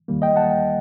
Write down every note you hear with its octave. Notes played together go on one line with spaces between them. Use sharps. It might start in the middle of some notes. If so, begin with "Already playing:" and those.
D#2 D#3 G3 A#3
D#5 G5
F#5 A5